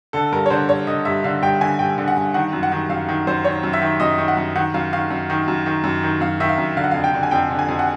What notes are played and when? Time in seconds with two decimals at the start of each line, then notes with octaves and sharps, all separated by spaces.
0.13 D3 A4
0.32 G2 A#4
0.46 C#5
0.50 D3 C5
0.69 G2 C#5
0.87 D3 D#5
1.05 G2 E5
1.24 D3 F5
1.42 G2 G5
1.61 D3 G#5
1.79 G2 G5
1.98 D3
2.08 F#5
2.17 G2
2.34 D#3 F#5
2.53 F#2
2.63 F#5
2.72 D#3
2.90 F#2 F5
3.09 D#3
3.27 F#2 C5
3.44 D#3 C#5
3.63 F#2
3.73 E5
3.82 D#3
4.00 F#2 D#5
4.18 D#3
4.28 F#5
4.37 F#2
4.56 D#3 F#5
4.74 F#2 F5
4.93 D#3 F5
5.11 F#2
5.30 D#3
5.48 F#2
5.66 D#3
5.84 F#2
6.03 D#3
6.21 F#2 F5
6.40 D#3 E5
6.49 F5
6.58 F#2
6.77 D3 F5
6.84 F#5
6.91 F2 F5
7.04 G5
7.13 D3
7.23 G#5
7.31 F2 G5
7.50 D3
7.59 G#5
7.69 F2
7.79 F#5